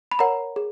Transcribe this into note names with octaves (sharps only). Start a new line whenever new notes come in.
B5
A#4 C#5 F#5 A#5
G#4